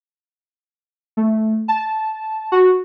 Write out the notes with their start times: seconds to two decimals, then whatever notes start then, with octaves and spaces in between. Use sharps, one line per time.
1.17 A3
1.68 A5
2.52 F#4